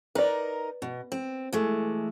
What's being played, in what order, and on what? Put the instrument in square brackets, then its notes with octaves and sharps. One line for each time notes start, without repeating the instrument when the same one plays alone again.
[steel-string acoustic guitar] D#4 A#4 [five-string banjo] B4 D5
[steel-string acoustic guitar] B2
C4
E3 G#3 A3